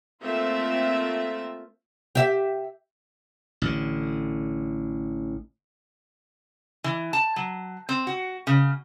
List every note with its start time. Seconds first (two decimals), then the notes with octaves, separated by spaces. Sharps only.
0.22 A3 A#3 C4 F4 E5
2.15 G4 E5
3.62 A1 D3
6.84 E3
7.13 A5
7.36 F#3
7.89 C4
8.07 F#4
8.47 C#3